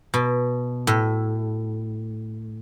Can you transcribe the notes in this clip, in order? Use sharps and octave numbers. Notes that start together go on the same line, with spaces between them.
B2
A2